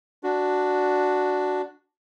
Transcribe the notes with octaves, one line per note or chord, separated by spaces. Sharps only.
D4 F#4